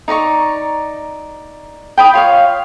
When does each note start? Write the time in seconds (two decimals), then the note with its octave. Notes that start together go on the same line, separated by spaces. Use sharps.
0.08 D#4 D5 A#5 C#6
1.98 G5 B5 D#6
2.13 F4 C#5 F5